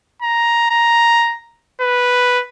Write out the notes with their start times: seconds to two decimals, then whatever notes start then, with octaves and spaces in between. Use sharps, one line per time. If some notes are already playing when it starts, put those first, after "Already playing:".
0.22 A#5
0.70 A#5
1.81 B4